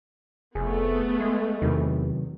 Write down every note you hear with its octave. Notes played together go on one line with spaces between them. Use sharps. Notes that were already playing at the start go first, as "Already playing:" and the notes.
F1 A3 B3 G#4
G#3
E2 C3 D#3 F#3